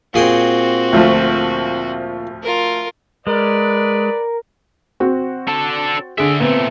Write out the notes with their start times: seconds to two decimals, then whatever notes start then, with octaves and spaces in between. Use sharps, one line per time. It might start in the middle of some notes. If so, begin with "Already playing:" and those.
0.14 A#2 C4 F#4 G#4 G5
0.93 D2 F3 A3
2.43 F4 A#4
3.27 G#3 A#4 B4 D5
5.00 C4 F#4
5.48 D4 A4
6.18 D3 G#4 D5 E5
6.40 A#2 A3 B3 C4